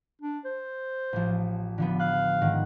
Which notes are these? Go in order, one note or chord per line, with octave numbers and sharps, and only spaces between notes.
D4
C5
A1 F3
D3 F3 B3
F5 F#6
G#2 D#3 F#5